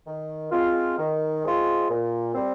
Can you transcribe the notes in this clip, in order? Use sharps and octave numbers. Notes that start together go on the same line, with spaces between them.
D#3
G#3 C4 F4
D#3
G#3 C4 F4
A#2
G3 C4